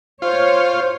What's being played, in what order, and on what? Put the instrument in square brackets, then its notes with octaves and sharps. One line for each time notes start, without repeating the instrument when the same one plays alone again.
[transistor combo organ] F4 [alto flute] C5 [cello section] C#5